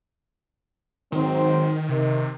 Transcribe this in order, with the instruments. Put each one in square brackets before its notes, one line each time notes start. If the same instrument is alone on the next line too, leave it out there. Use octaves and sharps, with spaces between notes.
[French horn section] G#2 F#3 C4 [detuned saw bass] D#3
[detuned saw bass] C3 [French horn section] D#3